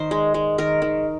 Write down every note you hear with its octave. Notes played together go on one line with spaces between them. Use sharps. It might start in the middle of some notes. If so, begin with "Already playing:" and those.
Already playing: D#3 C5
G#3
G#3
D#3 A#4
D#3